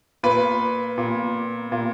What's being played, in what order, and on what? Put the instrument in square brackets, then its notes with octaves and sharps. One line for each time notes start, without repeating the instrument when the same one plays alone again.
[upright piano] A#2 B4
A#2
A#2